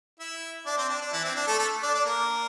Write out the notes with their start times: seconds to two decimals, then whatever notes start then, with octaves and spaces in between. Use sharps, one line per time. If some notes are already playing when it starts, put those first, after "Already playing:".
0.20 E4 E5
0.66 D4 D5
0.77 C4 C5
0.89 D4
1.01 D4
1.12 E3 E4
1.24 C4
1.36 D4
1.47 A3 A4
1.59 A3 A4
1.82 D4 D5
1.94 D4 D5
2.05 A#3 A#4